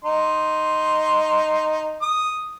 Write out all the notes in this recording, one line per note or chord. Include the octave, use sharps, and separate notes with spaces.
D#4 C6
D#6